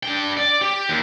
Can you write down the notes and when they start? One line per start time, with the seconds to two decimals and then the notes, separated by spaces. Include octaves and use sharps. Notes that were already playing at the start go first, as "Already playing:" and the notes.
0.03 D4 G5
0.37 D5
0.61 G4
0.89 D#2